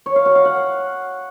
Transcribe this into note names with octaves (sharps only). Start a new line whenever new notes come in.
C#5
F5
F#4
F5
F#5